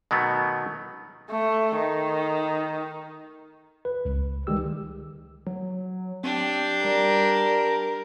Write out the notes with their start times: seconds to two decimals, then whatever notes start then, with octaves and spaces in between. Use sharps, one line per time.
0.11 B2 D#3 F#3 A3 B3
1.30 A3
1.75 D#3
3.85 B4
4.05 C#2
4.47 D#3 G3 G#3 G4 E6
5.47 F#3
6.24 C4 D4 G4
6.84 G3 A#4